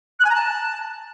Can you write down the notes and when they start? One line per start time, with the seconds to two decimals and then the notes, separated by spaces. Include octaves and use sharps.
0.19 F#6
0.24 G#5
0.29 A#5
0.34 A5